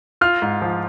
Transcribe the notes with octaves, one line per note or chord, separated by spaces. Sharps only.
F4 F6
G#2
F3